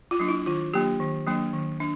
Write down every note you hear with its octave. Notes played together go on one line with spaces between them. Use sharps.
F4
F#3 A#3 D4
E4
D#3 F4
F#3 A#3 D4 G4
D#3
F#3 A#3 D4
D#3
D4